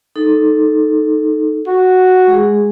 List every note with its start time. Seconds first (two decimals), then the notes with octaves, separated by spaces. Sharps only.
0.16 D#4 A4
1.67 F#4
2.27 G#3 G#4